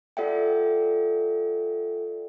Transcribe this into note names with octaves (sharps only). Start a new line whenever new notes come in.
F4 A4 D5 E5 F#5 G5